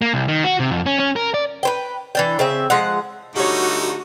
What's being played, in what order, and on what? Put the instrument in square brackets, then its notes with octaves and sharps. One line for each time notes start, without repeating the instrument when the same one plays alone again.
[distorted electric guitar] A#3
C2
D#3
F#4
C3
F2
C#4
C#4
A#4
D5
[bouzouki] B4 C5 G5
E3 D4 G5
C#3 C4 E5
F3 G#3 F#5
[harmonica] D3 A3 D#4 [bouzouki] G3 C#5 [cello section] F#4